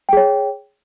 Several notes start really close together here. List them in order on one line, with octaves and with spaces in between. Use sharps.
G5 G#4 C#5